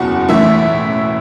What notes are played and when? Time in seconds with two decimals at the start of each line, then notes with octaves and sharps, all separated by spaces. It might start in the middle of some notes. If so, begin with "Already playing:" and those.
Already playing: F#1 E2 B2 F#5
0.29 A1 A2 E3 E5